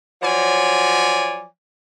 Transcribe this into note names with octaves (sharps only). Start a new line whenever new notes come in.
F3 F#3 C#5 D5 G#5